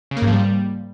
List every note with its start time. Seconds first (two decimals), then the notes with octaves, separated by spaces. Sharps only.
0.11 C#3
0.17 A#3
0.22 G#2
0.27 F3
0.32 G3